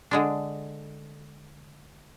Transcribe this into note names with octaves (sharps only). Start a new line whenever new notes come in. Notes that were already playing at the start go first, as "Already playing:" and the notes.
D3 G#3 D4